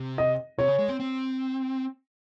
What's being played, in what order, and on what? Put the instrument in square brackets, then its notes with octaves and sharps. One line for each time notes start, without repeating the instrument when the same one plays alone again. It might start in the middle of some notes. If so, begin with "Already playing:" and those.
Already playing: [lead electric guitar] C3
[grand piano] D#5
[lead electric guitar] C3 [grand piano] C#5
[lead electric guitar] C#3
G#3
C4
C4